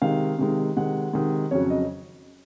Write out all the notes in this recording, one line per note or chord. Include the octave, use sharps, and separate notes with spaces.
C3 D#3 G#3 F5
C3 D#3 G#3
C3 D#3 G#3 F#5
C3 D#3 G#3
F2 C#3 F#3 C#5
D#5